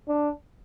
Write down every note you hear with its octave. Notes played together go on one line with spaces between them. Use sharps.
D4